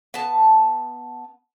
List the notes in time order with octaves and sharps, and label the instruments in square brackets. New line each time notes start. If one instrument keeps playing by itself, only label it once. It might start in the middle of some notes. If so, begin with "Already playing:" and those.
[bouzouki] B3 A5